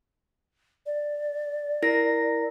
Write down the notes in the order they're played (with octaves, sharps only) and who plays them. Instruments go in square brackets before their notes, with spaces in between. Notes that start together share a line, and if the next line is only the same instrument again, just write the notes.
[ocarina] D5
[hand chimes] E4 A#4 A#6